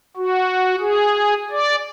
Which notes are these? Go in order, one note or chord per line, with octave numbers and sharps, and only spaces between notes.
F#4
G#4
D5